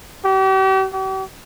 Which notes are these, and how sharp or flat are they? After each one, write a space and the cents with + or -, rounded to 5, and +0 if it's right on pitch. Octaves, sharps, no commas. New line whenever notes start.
G4 -40
G4 -45